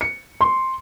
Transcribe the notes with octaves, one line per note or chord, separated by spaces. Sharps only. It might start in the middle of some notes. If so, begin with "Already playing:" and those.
C#7
C6